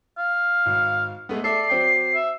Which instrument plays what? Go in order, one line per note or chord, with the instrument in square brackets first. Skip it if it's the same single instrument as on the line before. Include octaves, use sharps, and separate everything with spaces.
[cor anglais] F5
[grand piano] G#1
G#3 A3 B3
[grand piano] A4 E5 [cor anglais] D5 [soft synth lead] C7
[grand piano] F#3 C4 G5
[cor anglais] E5